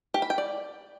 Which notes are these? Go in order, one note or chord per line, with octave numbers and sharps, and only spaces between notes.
G4
B5
G5
D5